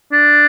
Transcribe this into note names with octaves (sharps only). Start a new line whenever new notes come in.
D4